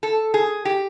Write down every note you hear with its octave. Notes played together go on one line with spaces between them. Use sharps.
A4
G#4
G4